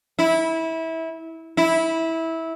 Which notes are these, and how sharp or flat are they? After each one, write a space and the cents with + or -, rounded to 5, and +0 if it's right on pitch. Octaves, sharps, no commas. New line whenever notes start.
E4 -20
E4 -15